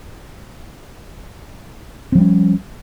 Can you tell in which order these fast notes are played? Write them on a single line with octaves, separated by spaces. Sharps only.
C4 F3 G3 C#4